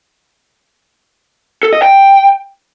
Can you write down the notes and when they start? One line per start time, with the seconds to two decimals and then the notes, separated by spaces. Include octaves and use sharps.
1.63 A4
1.73 D#5
1.82 G5